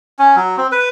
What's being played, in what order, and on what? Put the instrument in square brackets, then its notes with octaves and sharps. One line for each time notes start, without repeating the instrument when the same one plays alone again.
[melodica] C#4
F#3
C4
B4